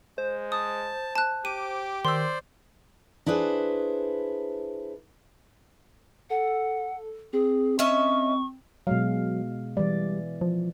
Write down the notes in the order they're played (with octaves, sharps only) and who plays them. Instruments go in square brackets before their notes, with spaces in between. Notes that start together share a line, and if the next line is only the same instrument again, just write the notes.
[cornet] G#3 [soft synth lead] C5
[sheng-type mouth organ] A5 [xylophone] D#6
[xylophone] A5 F#6
[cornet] G4 [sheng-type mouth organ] D6 [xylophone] D#7
[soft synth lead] D#3 [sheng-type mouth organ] C5 D5 [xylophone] C6 E6
[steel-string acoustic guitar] D4 E4 G#4 B4 C5
[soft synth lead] A4 [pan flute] F#5
[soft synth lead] C4 [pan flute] G#4
[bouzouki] C#4 D#5 E5 [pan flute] C#6
[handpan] B2 G#3 F5 [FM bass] F#3
[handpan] E3 D5 [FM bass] G3
[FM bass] F3